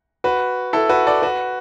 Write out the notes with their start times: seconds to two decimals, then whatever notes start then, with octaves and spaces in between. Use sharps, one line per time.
0.24 F#4 B4
0.73 E4 A4
0.89 F#4 B4
1.07 A4 D5
1.22 F#4 B4